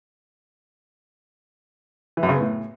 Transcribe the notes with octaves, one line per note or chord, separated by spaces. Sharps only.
E3
F#2
C#3
B3
A2